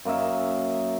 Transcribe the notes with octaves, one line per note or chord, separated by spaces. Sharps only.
F#2 A#3 D#5 E5